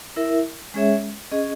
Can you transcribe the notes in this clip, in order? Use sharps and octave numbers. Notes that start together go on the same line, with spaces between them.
E4 A#4 E5
G#3 C#4 G#4 C#5 E5
C#4 G#4 D#5